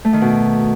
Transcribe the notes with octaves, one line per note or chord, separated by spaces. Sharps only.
A3
D#3
B2